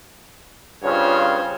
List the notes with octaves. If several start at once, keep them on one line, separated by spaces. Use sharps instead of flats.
G2 C#3 F4 C5 C#5